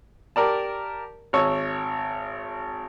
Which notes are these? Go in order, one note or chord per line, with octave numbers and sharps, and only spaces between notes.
G4 A#4 D5 A5
G#1 C#5 E6